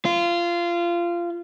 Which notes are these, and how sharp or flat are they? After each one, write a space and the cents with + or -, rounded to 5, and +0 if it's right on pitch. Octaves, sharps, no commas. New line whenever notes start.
F4 -20